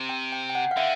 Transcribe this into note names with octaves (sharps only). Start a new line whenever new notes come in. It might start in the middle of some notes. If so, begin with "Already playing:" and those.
Already playing: C3
G5
G5
G5
F#5
F5
D3 E5